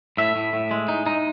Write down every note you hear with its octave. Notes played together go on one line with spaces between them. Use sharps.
A2 E5
A2
A2
G#3
D#4
D#4